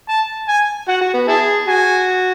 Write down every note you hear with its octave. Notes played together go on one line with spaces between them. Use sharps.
A5
G#5
F#4 F#5
F#4
B3
E4 G#4 A5
F#4 G#5